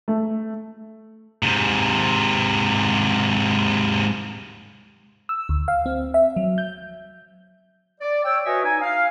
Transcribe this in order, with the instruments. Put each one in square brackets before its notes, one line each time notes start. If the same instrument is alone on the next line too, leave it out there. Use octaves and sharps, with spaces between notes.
[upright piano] A3
[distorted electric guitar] G#2 C3
[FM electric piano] E6
D2
F5
C4
E5
F#3
G6
[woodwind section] D5
C#5 G5 E6
F#4 B4 C#5 D#5 E5 G#5
D#4 G#5
F5